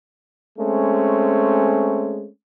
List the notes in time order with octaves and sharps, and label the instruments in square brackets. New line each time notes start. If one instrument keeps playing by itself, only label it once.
[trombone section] G#3 A3 C4 C#4